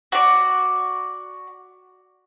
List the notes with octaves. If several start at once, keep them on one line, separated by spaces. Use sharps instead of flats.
F#4 D5